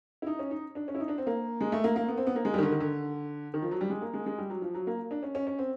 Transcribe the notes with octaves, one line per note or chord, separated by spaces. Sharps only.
E4
D#4
C#4
D#4
D4
C#4
E4
D#4
D4
C4
A#3
G#3
A3
A#3
A#3
B3
C4
B3
A#3
G#3
G3
D#3
D3
D#3
D3
D#3
F3
F#3
G3
G#3
A#3
G#3
G#3
G3
F#3
F3
F#3
A#3
D4
C#4
C#4
C#4
C4